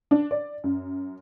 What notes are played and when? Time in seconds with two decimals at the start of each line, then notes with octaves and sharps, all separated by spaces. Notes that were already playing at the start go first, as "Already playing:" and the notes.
0.11 D4
0.31 D5
0.64 F#2